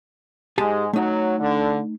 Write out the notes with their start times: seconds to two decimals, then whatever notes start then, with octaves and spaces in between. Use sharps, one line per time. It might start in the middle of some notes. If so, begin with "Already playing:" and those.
0.58 G#2 G#3 G4 G#5 A5
0.93 F#3 A3 D#4
1.39 D3